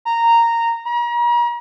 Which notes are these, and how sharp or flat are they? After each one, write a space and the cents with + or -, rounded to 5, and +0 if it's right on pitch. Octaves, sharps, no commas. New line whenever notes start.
A#5 -10
A#5 +40